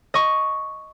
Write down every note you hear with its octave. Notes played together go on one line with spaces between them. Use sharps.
D#5 C#6